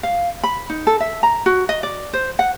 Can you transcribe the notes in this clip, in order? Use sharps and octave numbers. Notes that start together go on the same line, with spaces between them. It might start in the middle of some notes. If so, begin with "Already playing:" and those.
F5
B5
D#4
A4
E5
A#5
F#4
D#5
D5
C5
F#5